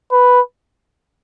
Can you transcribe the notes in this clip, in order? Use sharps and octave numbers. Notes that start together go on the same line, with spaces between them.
B4